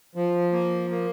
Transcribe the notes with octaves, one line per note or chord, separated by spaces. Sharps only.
F3
A#3
A#3